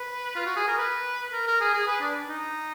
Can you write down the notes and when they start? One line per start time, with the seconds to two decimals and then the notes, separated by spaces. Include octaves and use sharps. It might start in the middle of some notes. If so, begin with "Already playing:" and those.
Already playing: B4
0.36 F4
0.46 F#4
0.56 G#4
0.68 A#4
0.78 B4
1.33 A#4
1.47 A#4
1.61 G#4
1.73 G#4
1.87 B4
2.01 D4
2.29 D#4